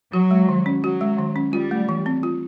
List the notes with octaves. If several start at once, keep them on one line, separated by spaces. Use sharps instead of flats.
F#3 F#4
G#3
D#3
C#4
F#3 F#4
G#3
D#3
C#4
G3 F4
A3
E3
C4
F4